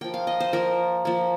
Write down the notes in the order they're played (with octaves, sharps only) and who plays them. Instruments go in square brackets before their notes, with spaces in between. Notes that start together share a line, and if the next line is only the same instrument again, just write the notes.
[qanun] F3 A#3 G5
F5
D#5
C5
F3 A#3 A#4
F3 A#3